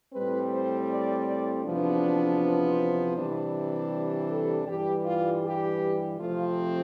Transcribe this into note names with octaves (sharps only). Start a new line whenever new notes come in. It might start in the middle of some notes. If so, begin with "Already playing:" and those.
A2 G3 C4 B4
C5
D5
D5
E2 C3 F3 B3 D4
C5
C3 E3 G3 D4
A4
G2 E3 G3 G4
F4
G4
C3 F3 A3 C4 F4